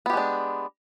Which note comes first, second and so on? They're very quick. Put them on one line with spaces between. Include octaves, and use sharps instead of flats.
B3 G4 G#3 D4